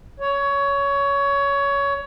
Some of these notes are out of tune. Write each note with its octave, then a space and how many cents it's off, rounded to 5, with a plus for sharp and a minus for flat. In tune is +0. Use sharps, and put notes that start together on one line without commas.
C#5 +20